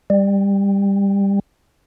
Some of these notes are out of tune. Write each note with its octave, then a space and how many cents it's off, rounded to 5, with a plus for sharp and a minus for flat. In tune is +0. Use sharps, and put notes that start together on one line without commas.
G3 +20